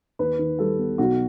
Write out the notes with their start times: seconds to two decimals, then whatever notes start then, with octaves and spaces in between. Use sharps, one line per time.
0.19 D#2 B4
0.39 D#3
0.59 G3 A4
0.79 B3
0.98 B1 F#4